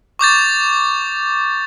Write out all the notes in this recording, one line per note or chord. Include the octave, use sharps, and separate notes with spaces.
C#6 D6 G6 A6